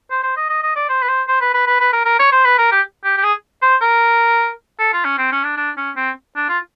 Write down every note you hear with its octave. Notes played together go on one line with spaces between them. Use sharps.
C5
C5
D#5
D#5
D#5
D5
C5
B4
C5
C5
B4
B4
B4
B4
A#4
A#4
C#5
C5
B4
A#4
G4
G4
G4
G#4
C5
A#4
A4
F4
C#4
C4
C#4
D4
D4
C#4
C4
D4
F4